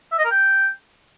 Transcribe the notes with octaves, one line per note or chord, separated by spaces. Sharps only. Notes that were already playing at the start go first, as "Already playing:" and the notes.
E5
D#5
A#4
G5